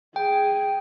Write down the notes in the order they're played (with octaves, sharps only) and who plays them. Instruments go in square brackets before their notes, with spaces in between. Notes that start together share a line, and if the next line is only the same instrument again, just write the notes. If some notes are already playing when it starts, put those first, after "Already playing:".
[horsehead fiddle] G#4 [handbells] G5